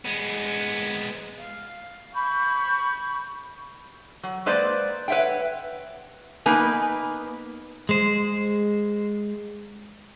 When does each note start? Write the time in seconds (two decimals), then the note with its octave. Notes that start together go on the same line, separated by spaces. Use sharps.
0.05 G#3 B3
1.38 F5
2.15 B5 C#6 G6
4.23 F#3
4.46 G#3 A#3 B4 C5 D5
5.08 B4 C#5 E5 F#5 G5
6.46 A#3 B3 D#4 B4 G#5
7.89 G#3 C5